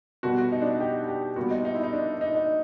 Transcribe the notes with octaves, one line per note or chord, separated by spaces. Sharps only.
B2 G3 B3 F#4
F#4
D#4
D4
D#4
G4
G4
A#2 G3 B3 F#4
D#4
D#4
E4
D#4
D4
D#4
D#4